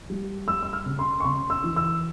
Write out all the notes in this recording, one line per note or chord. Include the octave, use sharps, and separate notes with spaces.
G3
G3 E6
E6
F6
C#3
C6
C#6
C#3 C6
E6
E3
E6